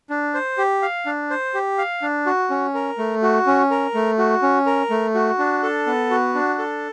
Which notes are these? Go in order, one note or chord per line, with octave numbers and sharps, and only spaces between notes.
D4
C5
G4
F5
D4
C5
G4
F5
D4
F#4
C#4
A#4
A3
F#4
C#4
A#4
A3
F#4
C#4
A#4
A3
F#4
D4
A4
B3
F#4
D4
A4